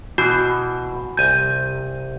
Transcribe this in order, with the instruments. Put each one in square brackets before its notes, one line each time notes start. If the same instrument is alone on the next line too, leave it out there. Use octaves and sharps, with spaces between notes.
[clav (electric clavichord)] B2 E3 [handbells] F#4
[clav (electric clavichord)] C2 G#5 [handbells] G6